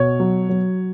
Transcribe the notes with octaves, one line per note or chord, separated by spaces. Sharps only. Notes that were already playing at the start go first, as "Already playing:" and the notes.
Already playing: B2 C#5
F#3
F#3